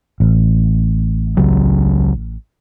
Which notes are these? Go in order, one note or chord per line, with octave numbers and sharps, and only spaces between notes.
A1
C#2 C#3 F#3